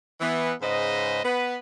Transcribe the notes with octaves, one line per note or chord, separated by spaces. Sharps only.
E3 B3
G#2 C#3 B4 C5 D#5
B3 B4